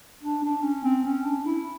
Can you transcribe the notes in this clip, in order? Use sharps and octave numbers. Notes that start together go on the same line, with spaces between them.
D4
D4
C#4
C4
C#4
D4
E4